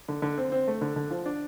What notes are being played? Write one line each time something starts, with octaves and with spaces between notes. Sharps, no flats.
D3
D3
C4
C4
A3
D3
D3
F3
D4